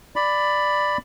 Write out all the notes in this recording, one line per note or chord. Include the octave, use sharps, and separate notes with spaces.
D5 B5